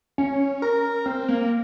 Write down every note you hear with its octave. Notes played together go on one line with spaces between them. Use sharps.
C#4
A#4
C4
A#3